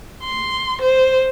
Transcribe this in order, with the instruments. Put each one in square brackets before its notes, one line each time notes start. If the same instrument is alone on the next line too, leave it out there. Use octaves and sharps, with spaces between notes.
[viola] C6
C5